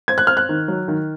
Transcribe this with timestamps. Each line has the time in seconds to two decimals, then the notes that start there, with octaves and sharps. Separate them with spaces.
0.08 C4 G#6
0.18 F#6
0.27 C4 F6
0.37 F#6
0.49 D#3
0.68 F#3
0.88 D#3